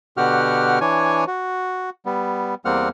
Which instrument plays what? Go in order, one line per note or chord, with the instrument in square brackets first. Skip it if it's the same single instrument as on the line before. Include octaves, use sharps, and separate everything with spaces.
[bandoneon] B2 D3 F#4 G4 F#5 F6
E3 D4 C#5 G#5
F#4
G3 B3
E2 G3 A#3 C4 F#5 F6